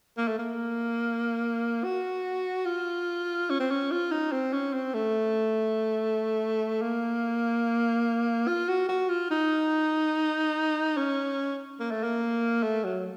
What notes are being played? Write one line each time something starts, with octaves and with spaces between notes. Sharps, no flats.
A#3
A3
A#3
F#4
F4
C#4
C4
C#4
F4
D#4
C4
C#4
C4
A3
A#3
F4
F#4
F#4
F4
D#4
C#4
A#3
A3
A#3
A3
F#3